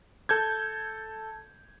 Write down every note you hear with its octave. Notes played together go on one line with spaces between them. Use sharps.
A4 G6 G#6